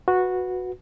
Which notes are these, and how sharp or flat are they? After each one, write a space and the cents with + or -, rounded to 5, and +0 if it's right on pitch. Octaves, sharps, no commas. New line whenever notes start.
F#4 -10 B4 +0